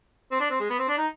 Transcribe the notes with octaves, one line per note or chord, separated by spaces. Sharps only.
C4
D4
C4
G#3
B3
C4
D4
D#4